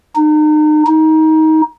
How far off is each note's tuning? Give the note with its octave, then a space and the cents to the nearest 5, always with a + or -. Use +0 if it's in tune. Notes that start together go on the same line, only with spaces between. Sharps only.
D#4 -35
D#4 +20